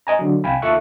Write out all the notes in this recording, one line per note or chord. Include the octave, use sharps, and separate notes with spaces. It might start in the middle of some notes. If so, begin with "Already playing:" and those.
D#5 G#5 A#5
D3 F#3
C2 F5 G5 G#5 B5
D#2 F4 A4 E5 C#6 F#6